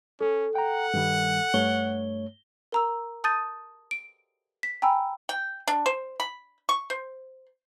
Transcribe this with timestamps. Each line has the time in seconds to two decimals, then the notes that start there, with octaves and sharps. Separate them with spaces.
0.21 C#4 A4
0.55 F#5 G5 A#5
0.94 G2 D#3 G3
1.54 G2 A3 C#5 G7
2.72 A#4 A#5 E6
3.24 A5 D#6 G6 A6 D#7
3.91 D7
4.63 B6
4.82 G5 G#5 A#5 B5 E6
5.29 G5
5.67 D4
5.86 C5
6.20 B5
6.69 C#6
6.90 C5